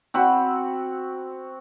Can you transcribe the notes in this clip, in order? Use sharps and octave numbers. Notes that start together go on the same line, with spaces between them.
C4 F#4 B5